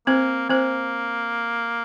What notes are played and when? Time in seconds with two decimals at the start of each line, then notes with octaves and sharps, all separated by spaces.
0.07 A#3 C4 C5
0.49 A#3 C4 C5